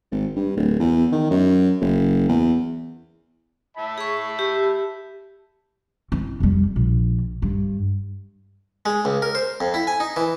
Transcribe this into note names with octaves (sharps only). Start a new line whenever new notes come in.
G#1
G2
D1
E2
D#3
F#2
F#1
E2
E5 A5 B5
G#4 C#6
G4
C4 E4
F2 G3
A#1
G2
G#3
C#2
A#4
C5
F2
E4
G#5
D#4
E3